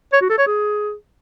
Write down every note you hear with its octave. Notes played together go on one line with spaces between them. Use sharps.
C#5
F#4
A4
C#5
G#4